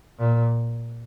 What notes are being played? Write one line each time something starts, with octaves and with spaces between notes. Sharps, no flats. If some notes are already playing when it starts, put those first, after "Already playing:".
A#2